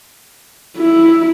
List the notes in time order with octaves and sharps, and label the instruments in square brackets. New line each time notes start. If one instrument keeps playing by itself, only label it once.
[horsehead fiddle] E4